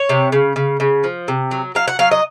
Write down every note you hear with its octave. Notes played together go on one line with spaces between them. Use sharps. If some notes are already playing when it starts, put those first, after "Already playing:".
Already playing: C#5
C3
C#3
C#3
C#3
F3
C3
F#3
F#3 F5
F#5
F#3 F5
D#5